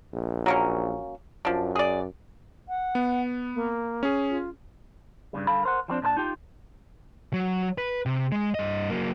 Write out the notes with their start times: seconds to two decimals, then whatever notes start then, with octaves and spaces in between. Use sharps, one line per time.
0.13 A#1
0.46 F#3 A#3 C#4
1.45 F#2 F3 D4
1.76 G#4 D5
2.69 F#5
2.95 B3
3.55 A#3
4.03 C#4 G#4
4.30 F4
5.33 G2 A#2 C#3 G3
5.47 D3 G3 A4 F5 B5
5.63 A#4 C5 F#5
5.88 F3 G3 C4 D4
6.02 A#2 D4 B4 A5
6.17 D#4 F4 G4
7.33 F#3
7.78 B4
8.06 C3
8.32 G#3
8.55 G2 D#5
8.90 F#3 A#3